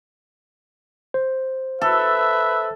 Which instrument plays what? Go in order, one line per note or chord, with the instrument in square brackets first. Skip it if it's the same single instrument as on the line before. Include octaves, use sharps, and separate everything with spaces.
[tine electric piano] C5
[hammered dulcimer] A4 [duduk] B4 [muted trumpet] E5